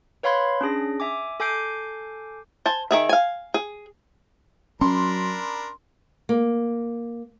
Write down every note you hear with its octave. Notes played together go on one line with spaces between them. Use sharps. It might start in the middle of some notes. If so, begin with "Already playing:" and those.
B4 C#5 F5 B5 C6 G#6
C#4 D4 G#4 A#6
E5 G#5 D6
A4 G#5 D6 G6 C7 D7
C5 G#5 A5
D#3 G#4 E5
F5 G#5
G#4
F#3 C#4 D4 A#4 B5 C6
A#3